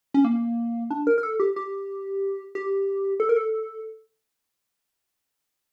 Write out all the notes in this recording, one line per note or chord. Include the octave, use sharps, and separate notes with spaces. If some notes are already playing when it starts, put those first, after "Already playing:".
C#4
A#3
D4
A#4
A#4
A4
G4
G4
G4
A4
A#4
A4